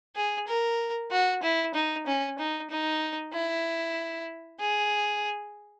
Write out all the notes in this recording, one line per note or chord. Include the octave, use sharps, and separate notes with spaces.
G#4
A#4
F#4
E4
D#4
C#4
D#4
D#4
E4
G#4